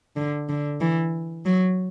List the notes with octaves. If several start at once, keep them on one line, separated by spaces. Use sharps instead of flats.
D3
D3
E3
F#3